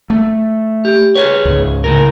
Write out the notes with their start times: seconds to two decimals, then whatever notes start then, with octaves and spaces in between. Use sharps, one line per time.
0.10 A3
0.85 G4
1.15 G#4 B4 C#5
1.45 C#2 G#2
1.84 A2 C#3 A#4